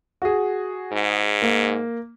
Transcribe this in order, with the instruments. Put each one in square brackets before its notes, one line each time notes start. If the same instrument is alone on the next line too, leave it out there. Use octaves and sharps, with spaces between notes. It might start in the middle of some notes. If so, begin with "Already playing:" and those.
[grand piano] F#4 G#4
[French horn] G#2
[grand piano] A#3